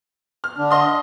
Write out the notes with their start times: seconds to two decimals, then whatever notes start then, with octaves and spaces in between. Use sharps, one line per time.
0.44 F6
0.58 D3 D4
0.71 D#5 C6 D#6